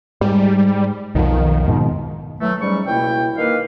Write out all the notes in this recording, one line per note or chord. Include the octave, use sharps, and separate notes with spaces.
G#2 G3
B1 F2 D#3
F2 G#2 B2
E3 F#3 A3
G#2 F#3 G3 C#4 C#6
C#2 B2 A#3 E4 G5
D#3 A#3 B4 F5